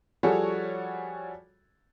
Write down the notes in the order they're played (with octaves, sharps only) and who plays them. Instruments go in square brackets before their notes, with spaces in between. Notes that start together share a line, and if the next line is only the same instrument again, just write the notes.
[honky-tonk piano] F3 G3 F#4 G#4 A4 C#5